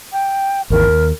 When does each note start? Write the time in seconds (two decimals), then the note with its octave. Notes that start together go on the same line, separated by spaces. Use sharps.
0.12 G5
0.70 G#1 D#2 E3 A#4
0.87 D#2